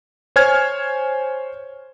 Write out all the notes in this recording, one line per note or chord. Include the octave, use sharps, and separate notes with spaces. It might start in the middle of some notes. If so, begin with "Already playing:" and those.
C5 C#5 G#5 F6 G#6